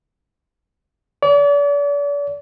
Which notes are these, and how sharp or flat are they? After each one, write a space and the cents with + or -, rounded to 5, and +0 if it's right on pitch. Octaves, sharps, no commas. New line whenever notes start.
D5 -40